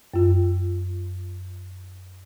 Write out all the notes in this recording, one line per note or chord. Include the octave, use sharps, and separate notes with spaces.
F#2 F4